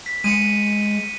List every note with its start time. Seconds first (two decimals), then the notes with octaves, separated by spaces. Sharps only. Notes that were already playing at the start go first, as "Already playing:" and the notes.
0.06 B6
0.24 G#3 C#7 D#7